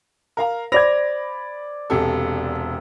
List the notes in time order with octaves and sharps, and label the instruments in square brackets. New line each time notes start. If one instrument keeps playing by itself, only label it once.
[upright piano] A#4 F5 A#5
[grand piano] C5 D5 G#6 [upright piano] B5 A#6 F7
[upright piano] E1 C3 A4